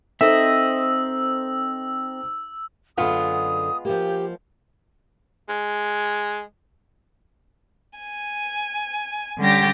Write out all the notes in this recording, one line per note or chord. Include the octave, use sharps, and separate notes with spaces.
C4 D#4 A4 C5 D#5 E5 E6
F#2 D3 G#3 B3 F4 D#6
F3 A#3 G4
G#3
G#5
D3 G3 C#4 G4 A6 A#6